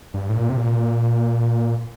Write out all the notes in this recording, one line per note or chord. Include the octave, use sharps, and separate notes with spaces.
G2
A2
A#2
C3
A#2